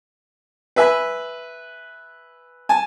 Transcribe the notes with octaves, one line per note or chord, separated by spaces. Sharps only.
B4 E5 G#5 B5
G#5 A5